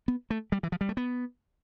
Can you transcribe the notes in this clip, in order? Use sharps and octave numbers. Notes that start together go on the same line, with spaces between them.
B3
A3
G3
E3
F3
G3
A3
B3